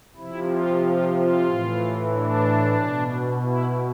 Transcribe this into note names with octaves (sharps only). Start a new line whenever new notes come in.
C3 F3 E4
F4
F4
F4
A2 E3
D4
B2
E4